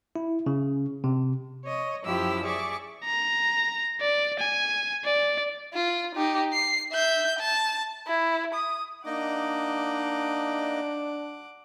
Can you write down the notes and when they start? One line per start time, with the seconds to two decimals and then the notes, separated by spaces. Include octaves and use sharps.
0.16 E4
0.46 C#3
1.04 C3
1.65 C#5 D#5
2.04 F#2 F3 E4 F4 G4 E6
2.43 G#4 D5 E5 C#6 D6
3.04 A#5
4.01 D5
4.39 G#5
5.05 D5
5.73 F4
6.15 D#4 G4
6.53 C7
6.92 E5 G6
7.39 A5
8.07 E4
8.55 D#6
9.06 A#3 D4 D#4 D#5 F#5 D6